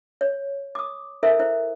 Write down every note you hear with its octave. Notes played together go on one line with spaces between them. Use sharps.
C#5
D6 D#6
E4 A4 A#4 C5 E5
E4 C5